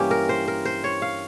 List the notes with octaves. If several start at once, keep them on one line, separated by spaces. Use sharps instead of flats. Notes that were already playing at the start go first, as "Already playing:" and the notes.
Already playing: G2 E3 A#3 C#4 G4
A#4
C5
A#4
C5
C#5
F5